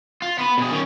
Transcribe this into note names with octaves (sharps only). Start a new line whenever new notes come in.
F4
B3 B4
B2 G#4
D#3 C#4